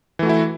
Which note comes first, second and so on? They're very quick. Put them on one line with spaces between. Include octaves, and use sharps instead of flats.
E3 A3 F#4 E4